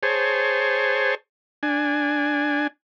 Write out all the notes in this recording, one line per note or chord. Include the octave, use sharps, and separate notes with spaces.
G#4 C5 C#5 A5
D4 G#5